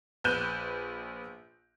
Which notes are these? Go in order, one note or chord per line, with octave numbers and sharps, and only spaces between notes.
A#1 B4 F#6 G6 E7